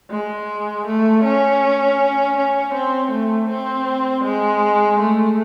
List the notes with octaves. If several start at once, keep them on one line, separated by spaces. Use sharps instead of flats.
G#3
A3
C#4
C#4
C4
A3
C4
G#3
A3